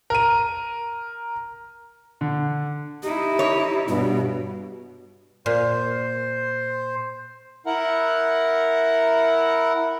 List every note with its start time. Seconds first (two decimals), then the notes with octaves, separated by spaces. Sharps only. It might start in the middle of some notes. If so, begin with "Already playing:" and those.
0.10 A#4 D#7
2.21 D3
3.03 D#4 E4 G4
3.39 C#5
3.88 G2 B2 F#4
5.46 A#2 C5
7.66 E4 A#4 F#5